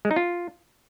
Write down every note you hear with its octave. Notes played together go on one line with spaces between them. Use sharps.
G#3
D#4
F4